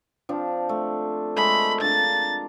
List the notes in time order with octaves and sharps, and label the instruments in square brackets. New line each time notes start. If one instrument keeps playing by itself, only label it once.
[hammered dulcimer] F3 C4 D4
A3
[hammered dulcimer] G#3 A3 A#4 [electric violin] B5
[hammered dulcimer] D4 F5 A#5 [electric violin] A6